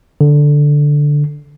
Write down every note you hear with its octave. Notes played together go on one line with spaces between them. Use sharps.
D3